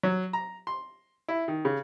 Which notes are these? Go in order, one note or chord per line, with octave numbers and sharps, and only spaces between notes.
F#3
A#5
C6
E4
D#3
C#3